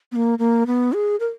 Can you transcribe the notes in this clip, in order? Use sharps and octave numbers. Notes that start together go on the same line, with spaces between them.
B3
A#3
A#3
B3
G#4
A#4